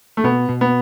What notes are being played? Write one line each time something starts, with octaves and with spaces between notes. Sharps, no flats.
A3
B2 B3
B2
B3